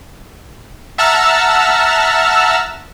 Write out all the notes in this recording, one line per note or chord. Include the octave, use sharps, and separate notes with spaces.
E5 F#5 A5 A#5 E6 F6